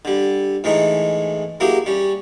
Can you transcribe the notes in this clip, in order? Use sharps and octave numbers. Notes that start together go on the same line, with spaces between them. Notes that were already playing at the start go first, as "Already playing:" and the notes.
D3 G3
A2 E3 G#3 A3 D#4
F#3 A#3 E4 G4 G#4
G3 C#4